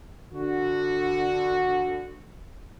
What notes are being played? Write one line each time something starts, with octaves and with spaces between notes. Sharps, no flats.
D3 F#4